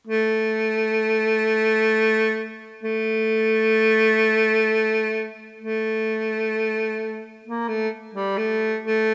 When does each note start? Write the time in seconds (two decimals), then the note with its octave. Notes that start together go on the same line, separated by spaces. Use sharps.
0.07 A3
2.83 A3
5.60 A3
7.45 A#3
7.68 A3
8.14 G3
8.37 A3
8.84 A3